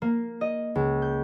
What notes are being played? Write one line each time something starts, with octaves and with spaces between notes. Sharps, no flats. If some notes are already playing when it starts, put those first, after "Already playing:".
A#3
D#5
C#2
G6